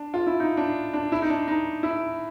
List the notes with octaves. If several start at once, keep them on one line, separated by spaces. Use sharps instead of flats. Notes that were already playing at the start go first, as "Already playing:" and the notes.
Already playing: D4
F4
E4
D#4
D4
D4
E4
D#4
D4
D#4
E4